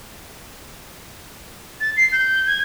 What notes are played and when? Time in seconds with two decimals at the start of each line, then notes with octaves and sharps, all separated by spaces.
1.81 A6
1.97 C7
2.12 G6
2.47 G#6